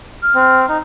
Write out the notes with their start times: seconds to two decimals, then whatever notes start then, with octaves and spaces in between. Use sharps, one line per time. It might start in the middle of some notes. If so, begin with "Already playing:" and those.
0.23 F6
0.35 C4
0.69 D#4